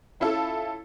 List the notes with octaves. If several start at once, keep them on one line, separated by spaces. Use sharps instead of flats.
C#4 E4 F4 A4